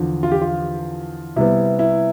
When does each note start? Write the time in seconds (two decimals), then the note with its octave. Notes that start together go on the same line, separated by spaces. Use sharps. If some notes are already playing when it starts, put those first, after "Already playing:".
Already playing: E2 D3 F3
0.23 F4
0.32 G4
0.41 F4
1.36 C3 G3 B3 E4
1.79 E4